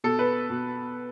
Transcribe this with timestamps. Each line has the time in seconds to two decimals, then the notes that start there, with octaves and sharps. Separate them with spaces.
0.04 B2 A4
0.19 B4
0.50 B2